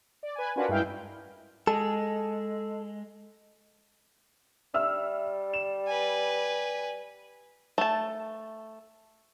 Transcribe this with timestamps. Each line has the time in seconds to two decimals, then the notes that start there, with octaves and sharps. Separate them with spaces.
0.23 D5
0.35 B4 G#5
0.56 C#4 D4 F4 F#4 A#4 B4
0.69 G2 G#3 E4 F5 G5
1.67 G#3 A4
4.74 G3 E5 E6 F6
5.53 E7
5.87 B4 G#5
7.78 A3 A5